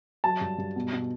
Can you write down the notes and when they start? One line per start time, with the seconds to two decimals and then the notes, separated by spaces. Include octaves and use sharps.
0.24 F#3 A5
0.41 G2
0.58 G2
0.76 B2
0.93 B2